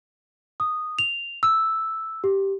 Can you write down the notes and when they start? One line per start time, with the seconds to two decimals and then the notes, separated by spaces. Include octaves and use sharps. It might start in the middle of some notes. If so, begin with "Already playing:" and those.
0.60 D#6
0.99 F7
1.43 E6
2.24 G4